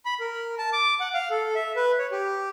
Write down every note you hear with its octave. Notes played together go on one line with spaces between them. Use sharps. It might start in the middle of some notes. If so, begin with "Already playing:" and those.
B5
A#4
A5
D6
F#5
F5
A4
E5
B4
C#5
G4